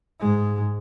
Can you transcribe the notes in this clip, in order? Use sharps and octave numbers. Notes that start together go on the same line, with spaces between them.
G#2 G#3